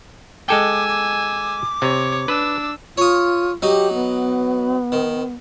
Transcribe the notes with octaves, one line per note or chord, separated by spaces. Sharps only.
G#3 A4 G5 G#5 D6 E6
D6
C3 C#5
D4 B4 E6
F4 C#5 D#6
F#3 D#4 G4
B3
D#3